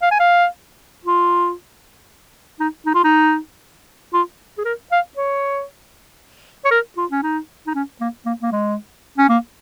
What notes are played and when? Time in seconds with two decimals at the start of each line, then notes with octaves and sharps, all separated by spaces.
0.02 F5
0.12 G#5
0.20 F5
1.05 F4
2.60 D#4
2.86 D#4
2.95 F4
3.04 D#4
4.14 F4
4.58 G#4
4.65 A#4
4.92 F5
5.17 C#5
6.65 C#5
6.71 A#4
6.97 F4
7.11 C#4
7.23 D#4
7.67 D#4
7.75 C#4
8.01 A#3
8.26 A#3
8.42 A#3
8.52 G#3
9.18 C#4
9.29 A#3